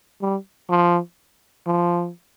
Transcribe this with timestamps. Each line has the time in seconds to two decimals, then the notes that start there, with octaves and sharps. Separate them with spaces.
0.22 G3
0.70 F3
1.67 F3